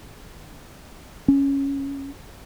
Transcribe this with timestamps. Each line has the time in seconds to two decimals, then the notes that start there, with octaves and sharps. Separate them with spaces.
1.28 C#4